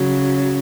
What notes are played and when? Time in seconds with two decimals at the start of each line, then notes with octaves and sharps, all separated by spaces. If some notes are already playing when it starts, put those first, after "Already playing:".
Already playing: C#3 F#3